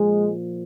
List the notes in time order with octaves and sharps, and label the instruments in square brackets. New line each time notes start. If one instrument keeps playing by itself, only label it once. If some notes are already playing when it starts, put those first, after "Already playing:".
Already playing: [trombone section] A#2 F3 G#3